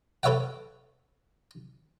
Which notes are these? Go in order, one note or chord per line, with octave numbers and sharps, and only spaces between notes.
A4 B4 C#5 E5 F#5 G5